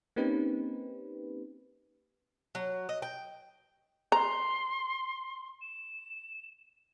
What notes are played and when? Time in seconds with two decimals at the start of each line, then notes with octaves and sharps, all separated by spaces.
0.16 A#3 C4 C#4 D#4 G4 B4
2.55 F#3
2.89 D#5
3.02 G5
4.12 A#5 C6
5.61 E7